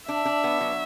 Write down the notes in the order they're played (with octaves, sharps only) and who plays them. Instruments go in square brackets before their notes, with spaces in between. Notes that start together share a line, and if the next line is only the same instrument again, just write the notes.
[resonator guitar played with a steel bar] D4 [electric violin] E5
[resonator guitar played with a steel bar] D4
B3
F#3